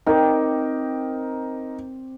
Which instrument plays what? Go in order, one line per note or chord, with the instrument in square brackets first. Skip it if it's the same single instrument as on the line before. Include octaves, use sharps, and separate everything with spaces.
[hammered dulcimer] C4 G5 D6 [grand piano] D#4 A#4